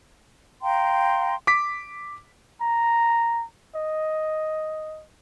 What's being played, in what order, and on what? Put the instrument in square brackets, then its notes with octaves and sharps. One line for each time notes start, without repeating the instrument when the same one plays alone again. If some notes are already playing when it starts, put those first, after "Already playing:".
[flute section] F5 G5 A#5 C6
[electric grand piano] D6 B6
[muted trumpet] A#5
D#5